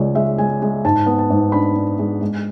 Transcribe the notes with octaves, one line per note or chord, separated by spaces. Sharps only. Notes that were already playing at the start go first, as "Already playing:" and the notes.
Already playing: C#2 G#3 C#5 D5
G#3 E5
G#3 G#5
G#3
G#2 A5
B3
A5
G#2
D4 B5
D4
G#3
G#3